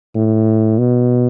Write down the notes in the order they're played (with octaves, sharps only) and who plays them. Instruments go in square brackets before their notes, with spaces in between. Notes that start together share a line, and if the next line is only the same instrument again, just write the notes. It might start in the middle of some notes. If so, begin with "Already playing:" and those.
[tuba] A2
B2